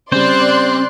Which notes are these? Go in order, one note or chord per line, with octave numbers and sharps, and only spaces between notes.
C#3 G3 C4 C5 D5 C6 F#6